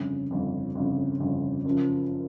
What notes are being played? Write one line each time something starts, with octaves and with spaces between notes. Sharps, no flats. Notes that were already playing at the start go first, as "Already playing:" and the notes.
Already playing: G1 F2 C#3
G1 F2 C#3
G1 F2 C#3
G1 F2 C#3
F#1 F#2 C#3 F3